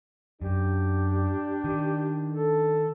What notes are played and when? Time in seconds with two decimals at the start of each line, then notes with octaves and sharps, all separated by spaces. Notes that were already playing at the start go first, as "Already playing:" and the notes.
0.42 F#2 D4 G4
1.64 D#3
2.32 A4